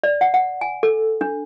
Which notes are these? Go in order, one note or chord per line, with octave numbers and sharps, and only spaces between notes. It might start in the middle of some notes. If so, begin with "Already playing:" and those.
D5
F#5
F#5
G#5
A4
D4